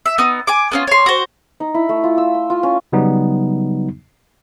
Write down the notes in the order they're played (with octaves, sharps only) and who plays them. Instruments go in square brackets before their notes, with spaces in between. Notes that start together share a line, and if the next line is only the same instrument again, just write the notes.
[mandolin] E5
B3 D#4
G#5 D6
B3 C#4 F4
C#5 C6
F#4 C5
[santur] D#4
E4
A3
F4
E6
C6
F4
C#4
[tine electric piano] C#3 F#3 G3 B3 D#4